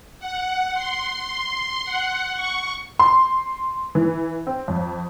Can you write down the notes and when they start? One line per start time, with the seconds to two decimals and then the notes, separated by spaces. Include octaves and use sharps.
0.20 F#5
0.74 C6
1.85 F#5
2.35 C#6
2.99 C6
3.95 E3
4.47 C4
4.68 F2